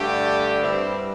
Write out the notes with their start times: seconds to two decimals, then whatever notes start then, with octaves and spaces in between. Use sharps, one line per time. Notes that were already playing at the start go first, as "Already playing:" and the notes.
Already playing: G2 D3 A3 D4 G4
0.62 G2 G3 C4 E4